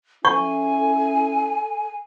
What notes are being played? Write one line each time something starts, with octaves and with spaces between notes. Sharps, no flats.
C#4 E4 A4 G#5 C#6